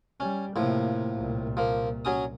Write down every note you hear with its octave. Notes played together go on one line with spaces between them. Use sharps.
G3 C#4
A2 C3 F3 A#3
C2 A#2
F3 A#3
F#3 C#4 D#6